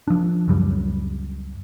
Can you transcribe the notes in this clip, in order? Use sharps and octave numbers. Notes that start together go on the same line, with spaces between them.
F3 D4
C#2 F#2 G3